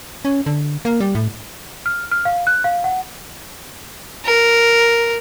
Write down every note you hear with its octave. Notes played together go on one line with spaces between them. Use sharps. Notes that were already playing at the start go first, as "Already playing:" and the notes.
C#4
D3
A#3
G3
A2
F6
F6
F5
F#6
F5
F#5
A#4